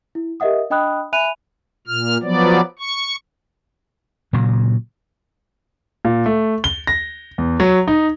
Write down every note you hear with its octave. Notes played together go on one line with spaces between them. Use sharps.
E4
G4 A#4 D#5 E5 F#5 D#6
D4 D#5 G5 B5 D#6 F#6
E5 G#5 B5 F#6 D#7 F7
A#2 F6
F3 F#3 B3 D5
C#6
A#2 C#3 F#3
A#2
A3
G7
A#6
E2
F#3
D#4